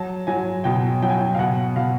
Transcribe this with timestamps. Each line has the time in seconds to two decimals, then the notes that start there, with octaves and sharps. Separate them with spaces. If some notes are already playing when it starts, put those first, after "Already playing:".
Already playing: F#3 A5
0.27 F#3 G#5
0.64 B2 G5
1.02 F#3 G5
1.09 G#5
1.18 G5
1.34 F5
1.39 B2 F#5
1.76 B2 F5